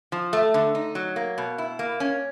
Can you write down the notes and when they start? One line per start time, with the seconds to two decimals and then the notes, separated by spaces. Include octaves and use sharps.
0.12 F3
0.33 A3
0.54 D3
0.75 D#4
0.95 F#3
1.16 A#3
1.38 B2
1.58 E4
1.79 A#3
2.00 C#4